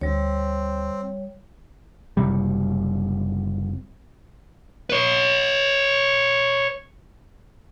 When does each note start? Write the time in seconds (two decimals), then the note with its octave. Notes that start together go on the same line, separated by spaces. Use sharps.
0.01 D2 G3 C4 C#5
2.17 F#1 C3 G3
4.90 B4 C#5